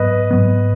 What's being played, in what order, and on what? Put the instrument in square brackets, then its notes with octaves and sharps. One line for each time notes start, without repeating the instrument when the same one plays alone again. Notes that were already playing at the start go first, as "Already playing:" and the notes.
Already playing: [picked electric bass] G#2 F#3 B3 [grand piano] B4 D#5
[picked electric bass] G#2 F#3 B3